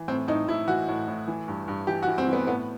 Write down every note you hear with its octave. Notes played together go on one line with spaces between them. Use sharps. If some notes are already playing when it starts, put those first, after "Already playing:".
Already playing: E3
A2 C4
A2 D#4
A2 E4
E3 F#4
A2
A2
E3
G2
G2
E3 G4
F#4
E3
C4
E3 B3
A2 B3